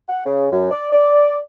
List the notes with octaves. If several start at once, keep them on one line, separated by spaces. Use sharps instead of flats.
F#5
C#3
F#2
D5
D5